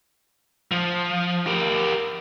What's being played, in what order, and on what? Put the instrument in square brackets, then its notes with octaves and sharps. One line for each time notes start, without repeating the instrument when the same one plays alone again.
[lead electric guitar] F3
G4 A#4